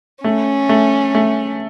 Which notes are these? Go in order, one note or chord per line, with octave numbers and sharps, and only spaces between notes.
A3 C#4
A3
A3